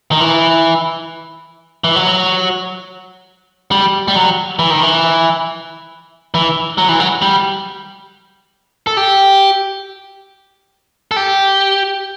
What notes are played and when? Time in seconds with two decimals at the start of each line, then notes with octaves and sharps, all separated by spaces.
0.11 D#3
0.20 E3
1.84 E3
1.96 F#3
3.71 G3
4.08 G3
4.15 F#3
4.59 E3
4.71 D#3
4.83 E3
6.34 E3
6.78 F#3
6.89 E3
7.00 F#3
7.22 G3
8.87 A4
8.97 G4
11.11 A4
11.16 G4